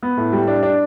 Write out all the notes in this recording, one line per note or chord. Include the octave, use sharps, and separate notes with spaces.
B3
A2
G3
D4
D4